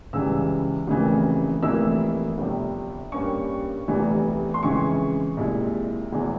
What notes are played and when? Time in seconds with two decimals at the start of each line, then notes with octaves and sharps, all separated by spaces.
0.13 C#2 C#3 E3 G3 E6
0.88 F1 F2 C#3 E3 A#3
1.63 F1 F2 E3 A#3 E4 E6
2.38 G1 F2 C3 G3
3.12 G2 G3 A#3 C#4 C#6
3.88 F1 E2 E3 G3
4.54 C6
4.63 F2 C#3 E3 G#3 E4 C#6
5.37 C2 A#2 G#3 E4
6.13 E1 E2 E3